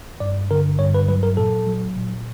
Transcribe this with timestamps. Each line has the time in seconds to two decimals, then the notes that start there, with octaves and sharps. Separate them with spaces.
0.20 G2 D5
0.51 D3 A#4
0.79 G2 C#5
0.94 B4
1.09 F#3 B4
1.23 A#4
1.37 A#2 A4
1.67 F#3
1.96 A#2